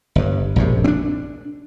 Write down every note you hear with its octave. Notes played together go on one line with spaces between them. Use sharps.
G1 G2
A#1 F#2 C3
C4 D4